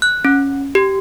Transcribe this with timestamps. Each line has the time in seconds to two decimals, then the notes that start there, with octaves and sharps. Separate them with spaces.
0.02 F#6
0.25 C#4
0.75 G4